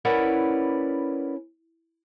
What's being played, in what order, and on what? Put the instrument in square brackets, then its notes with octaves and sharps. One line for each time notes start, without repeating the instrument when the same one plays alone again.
[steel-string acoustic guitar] C#4 E4 A#4 B4 D5 F#5